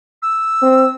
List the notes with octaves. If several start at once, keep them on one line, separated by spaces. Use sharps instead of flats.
E6
C4